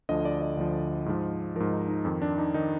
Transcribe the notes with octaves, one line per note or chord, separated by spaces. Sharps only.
D2 D3 F3 D#5
D5
D#5
D2 D3 F3
G#2 F3
G#2 F3 A#4
D#4
D#4
F2 D#3
D4
D#4
D#3 D#4